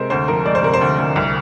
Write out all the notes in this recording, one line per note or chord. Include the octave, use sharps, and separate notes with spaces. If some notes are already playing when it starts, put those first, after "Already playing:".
Already playing: C3 G#3 A#4 C5
D2 C5
F3 A#4
G#3 D5
C5
C3 A#4
C5
D2
D2
C2